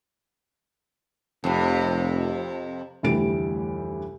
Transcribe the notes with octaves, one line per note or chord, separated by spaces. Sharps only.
F1 F2 C3
F1 D2 E3 G3 G4 D7